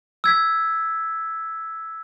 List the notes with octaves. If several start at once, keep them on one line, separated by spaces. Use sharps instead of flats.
E6 G#6 B6